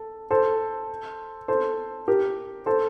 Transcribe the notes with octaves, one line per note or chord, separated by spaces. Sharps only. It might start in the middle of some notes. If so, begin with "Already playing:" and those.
Already playing: A4
A4 C5
A4 C5
G4 A#4
A4 C5